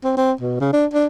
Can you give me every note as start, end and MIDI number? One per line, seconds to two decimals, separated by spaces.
0.04 0.13 60
0.17 0.33 60
0.41 0.60 47
0.60 0.68 49
0.73 0.86 62
0.94 1.07 62